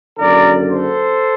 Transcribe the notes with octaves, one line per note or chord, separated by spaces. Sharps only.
F#1 F#2 D3 A#4 D5
A4 C5